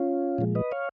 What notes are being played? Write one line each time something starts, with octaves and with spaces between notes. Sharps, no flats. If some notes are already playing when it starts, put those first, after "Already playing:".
Already playing: C#4 F4
A#2 F3 G#3
B4 D#5
C#5 F5